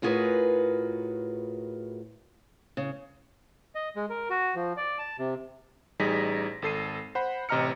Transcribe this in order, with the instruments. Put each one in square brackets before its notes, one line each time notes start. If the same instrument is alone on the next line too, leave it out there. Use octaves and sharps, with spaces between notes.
[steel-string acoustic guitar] A2 F4 F#4 G#4 A#4 B4
C#3
[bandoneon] D#5
G#3
A#4
F#4
F3
D5
A5
C3
[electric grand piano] A1 G3 D#4 G#4 A#6 B6
G#1 A4 C7 D#7
C5 F#5 B5
A1 C3 D#5 A#5 F6 C#7